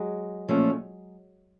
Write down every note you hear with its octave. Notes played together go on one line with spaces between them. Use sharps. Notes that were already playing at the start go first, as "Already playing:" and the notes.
Already playing: F#3 G#3
A#2 F3 A3 C#4